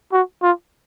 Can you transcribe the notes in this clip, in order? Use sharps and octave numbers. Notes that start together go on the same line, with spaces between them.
F#4
F4